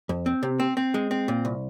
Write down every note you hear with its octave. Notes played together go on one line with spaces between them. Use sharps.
F2
C4
C3
C4
C4
G#3
C4
A#2
C2